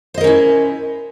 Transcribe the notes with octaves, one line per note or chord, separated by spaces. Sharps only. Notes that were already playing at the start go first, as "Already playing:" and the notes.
C#4 E4 A#4 C5 D#5